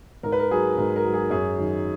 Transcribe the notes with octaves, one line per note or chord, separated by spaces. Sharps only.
G#2 A#4
B4
A#4
F#3 G#4
G#2 A#4
A#4
F#3
G#4
F#2 G#4
D#3 F#3